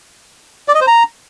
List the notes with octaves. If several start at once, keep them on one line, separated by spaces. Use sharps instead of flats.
D5
D#5
C5
A#5